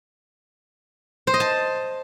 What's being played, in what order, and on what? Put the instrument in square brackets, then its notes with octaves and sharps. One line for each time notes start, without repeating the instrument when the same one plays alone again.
[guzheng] C5
D#5
A5